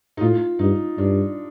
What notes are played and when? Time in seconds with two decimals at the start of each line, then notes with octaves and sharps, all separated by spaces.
0.17 D#4
0.21 A2 F4
0.59 G2 D#4
0.98 G2 D4